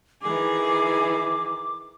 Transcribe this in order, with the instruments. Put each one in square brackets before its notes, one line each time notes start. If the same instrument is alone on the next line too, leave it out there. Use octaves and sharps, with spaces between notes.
[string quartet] D#3 E3 G#4 [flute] D6